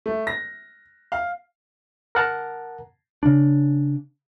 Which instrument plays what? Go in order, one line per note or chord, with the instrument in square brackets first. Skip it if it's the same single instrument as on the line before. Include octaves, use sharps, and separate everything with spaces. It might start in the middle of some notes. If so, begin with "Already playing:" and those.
[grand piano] A3
A#6
F5
[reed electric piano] A#4 F#5 A5 A#5
[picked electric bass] C#3 D4